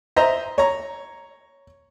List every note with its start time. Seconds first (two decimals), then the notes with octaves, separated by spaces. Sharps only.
0.16 C5 D#5 E5 A#5
0.58 C#5 A#5